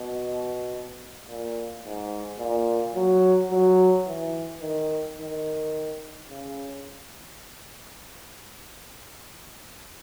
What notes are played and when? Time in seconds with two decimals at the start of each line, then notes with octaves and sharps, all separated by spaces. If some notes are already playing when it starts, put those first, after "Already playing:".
Already playing: B2
1.27 A#2
1.84 G#2
2.39 A#2
2.94 F#3
3.51 F#3
4.07 E3
4.62 D#3
5.18 D#3
6.29 C#3